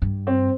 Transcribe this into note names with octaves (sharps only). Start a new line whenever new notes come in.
G2
C4